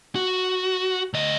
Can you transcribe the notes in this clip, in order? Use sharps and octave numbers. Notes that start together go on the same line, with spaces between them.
F#4
D2 D#5